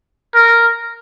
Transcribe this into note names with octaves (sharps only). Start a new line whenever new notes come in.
A#4